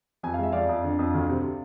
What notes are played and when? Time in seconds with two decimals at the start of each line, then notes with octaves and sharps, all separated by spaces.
0.23 F2 G#5
0.34 F5
0.39 G#3 E5
0.52 F2 D5 F5
0.69 F2
0.84 D3
0.99 F2
1.14 D2
1.29 C3